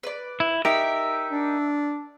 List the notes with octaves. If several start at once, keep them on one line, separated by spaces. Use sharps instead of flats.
B4 D5
E4
D#4 G4 A#4 E5
D4